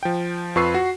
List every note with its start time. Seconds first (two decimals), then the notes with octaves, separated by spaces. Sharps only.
0.03 F3 G5
0.56 F2 F4 B4 C#6 E6 C7
0.74 F#4